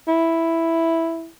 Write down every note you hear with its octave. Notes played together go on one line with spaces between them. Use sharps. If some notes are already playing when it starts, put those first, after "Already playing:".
E4